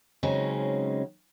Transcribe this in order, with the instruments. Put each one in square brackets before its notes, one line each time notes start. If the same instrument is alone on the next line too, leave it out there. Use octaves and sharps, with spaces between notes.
[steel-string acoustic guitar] C#3 F#3 G#3 C4 C#4 D#4